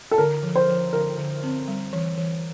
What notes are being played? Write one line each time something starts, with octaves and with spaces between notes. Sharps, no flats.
A4
D3 A#4
F3
C5
F3
D3 A#4
D3
C4
G3
E3
E3